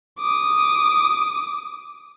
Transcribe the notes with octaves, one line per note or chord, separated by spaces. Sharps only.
D6 D#6